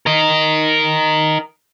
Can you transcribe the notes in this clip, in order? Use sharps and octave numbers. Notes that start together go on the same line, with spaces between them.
A#4 D#5